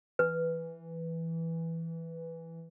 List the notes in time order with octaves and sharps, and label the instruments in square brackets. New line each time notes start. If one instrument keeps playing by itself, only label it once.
[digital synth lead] E3 [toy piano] B4